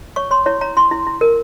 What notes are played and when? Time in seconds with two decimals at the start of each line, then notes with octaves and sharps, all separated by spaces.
0.16 C#5 C#6
0.31 C#5 C6
0.46 E4 C#5
0.61 C#5 A#5
0.77 E4 C6
0.91 E4
1.07 E4
1.21 A#4